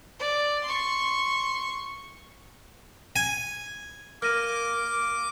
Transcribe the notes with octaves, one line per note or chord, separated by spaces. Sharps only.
D5
C6 C#6
G#5
A#3 D6 F6 A#6 D#7